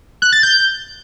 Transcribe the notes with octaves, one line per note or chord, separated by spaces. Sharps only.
F#6
A6
G6